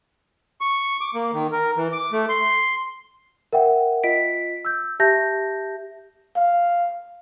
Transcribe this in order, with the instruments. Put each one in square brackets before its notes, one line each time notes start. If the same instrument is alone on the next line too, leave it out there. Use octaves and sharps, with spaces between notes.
[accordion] C#6
D6
A#3
D#3
A#4
E3
D6
A3
C6
[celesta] A#4 E5 F#5 G5
F4 D#5 B6 D7
E6 G6
G4 E5 A5 G6 A#6
[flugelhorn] F5